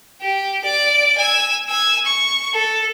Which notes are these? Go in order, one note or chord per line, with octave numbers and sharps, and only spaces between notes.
G4
D5 D6
G#5 E6
G#5 E6
C#6
A4